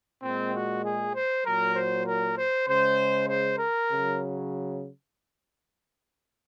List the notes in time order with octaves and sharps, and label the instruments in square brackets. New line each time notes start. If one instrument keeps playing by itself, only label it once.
[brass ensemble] A#2 G#3 C4
F#4
G#4
C5
A#2 F#3 A#4
C5
A#4
C5
C#3 G#3 C5
C5
A#4
C#3 F#3